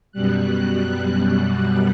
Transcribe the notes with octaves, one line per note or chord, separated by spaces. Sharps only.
F#2 B2 G3 F#6